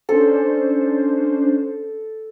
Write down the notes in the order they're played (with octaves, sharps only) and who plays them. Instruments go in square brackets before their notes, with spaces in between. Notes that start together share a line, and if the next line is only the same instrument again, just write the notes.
[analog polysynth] C#4 D4 C5 [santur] A4